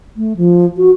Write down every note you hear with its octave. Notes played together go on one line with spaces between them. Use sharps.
A3
F3
F#4